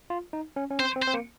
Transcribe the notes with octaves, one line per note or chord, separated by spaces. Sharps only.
F4
D#4
C#4
C#4
C4 C5
C4
C5
C4
A#3